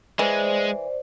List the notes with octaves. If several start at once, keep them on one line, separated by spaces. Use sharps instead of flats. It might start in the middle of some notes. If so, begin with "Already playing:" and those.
E3 G#3 C5 D5